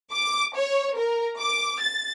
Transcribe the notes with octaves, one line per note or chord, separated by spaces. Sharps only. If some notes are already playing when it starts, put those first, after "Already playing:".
D6
C#5
A#4
D6
A6